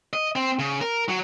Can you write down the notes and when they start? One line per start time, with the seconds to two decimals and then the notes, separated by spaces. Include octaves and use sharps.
0.13 D#5
0.36 C4
0.59 C#3
0.81 A#4
1.09 F#3